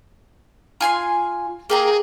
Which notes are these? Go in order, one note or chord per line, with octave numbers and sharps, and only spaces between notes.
F4 G#5 C6
A#3 G4 G#4 A#5